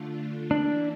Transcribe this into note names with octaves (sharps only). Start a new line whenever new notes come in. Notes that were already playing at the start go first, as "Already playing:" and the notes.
Already playing: D3 A3 D4 F4
E3 A#3 D4 E4